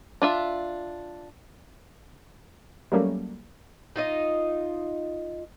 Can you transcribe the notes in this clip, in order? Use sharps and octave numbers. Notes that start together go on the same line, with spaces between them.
D4 F4 E5
F#3 G3 A3 A#3 C#4
D#4 F4 D#5